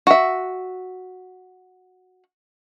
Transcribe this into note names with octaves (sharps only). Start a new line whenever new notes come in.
F#4 E5